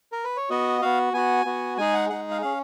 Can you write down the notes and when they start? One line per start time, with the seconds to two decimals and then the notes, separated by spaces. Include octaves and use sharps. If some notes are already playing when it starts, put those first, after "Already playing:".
0.12 A#4
0.24 B4
0.37 C#5
0.50 B3 F#4 D#5
0.81 B3 F#4 F5
1.13 B3 F#4 G#5
1.45 B3 F#4
1.78 G#3 D#4 G#4 G#5
1.94 F#5
2.09 G#3 D#4 G#4 F#5
2.31 F5
2.41 C#4 G#4 F5